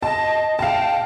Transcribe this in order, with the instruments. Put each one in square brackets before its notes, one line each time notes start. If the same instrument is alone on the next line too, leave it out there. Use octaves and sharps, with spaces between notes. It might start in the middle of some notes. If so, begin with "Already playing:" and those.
[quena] D#5 [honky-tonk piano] A5
[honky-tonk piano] F5 A5 [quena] G5